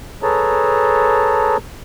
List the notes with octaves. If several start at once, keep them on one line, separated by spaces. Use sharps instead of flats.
G#4 A4 B4 C#5 A5 A#5